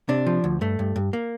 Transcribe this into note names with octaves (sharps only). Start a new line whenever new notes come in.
C3 D4
F3
D2
G2 A3
G2
G2
A#3